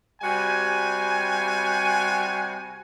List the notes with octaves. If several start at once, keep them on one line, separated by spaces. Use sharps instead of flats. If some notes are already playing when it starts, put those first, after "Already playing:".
C3 G3 F#4 G#5